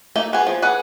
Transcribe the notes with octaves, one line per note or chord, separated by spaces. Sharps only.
A3 A#3 D#4
B3 G#4
F3
G#4 B4 F#5